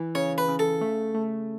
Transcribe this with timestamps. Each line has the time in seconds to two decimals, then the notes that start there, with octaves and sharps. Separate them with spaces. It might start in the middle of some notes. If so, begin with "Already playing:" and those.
Already playing: E3
0.15 C#3 C#5
0.38 B4
0.48 C#3
0.59 A4
0.81 A3
1.15 A3